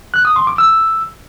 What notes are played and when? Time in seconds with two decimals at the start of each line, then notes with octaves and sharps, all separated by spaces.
0.14 F#6
0.25 D#6
0.36 C6
0.47 D6
0.58 E6